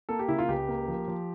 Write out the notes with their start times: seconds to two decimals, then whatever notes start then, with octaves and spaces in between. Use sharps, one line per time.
0.09 A#3 A4
0.19 G4
0.28 C#3 E4
0.39 F4
0.48 C#2 G4
0.69 A#3
0.88 F3
1.08 F3